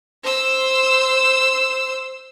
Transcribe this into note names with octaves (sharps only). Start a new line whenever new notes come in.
C5 E6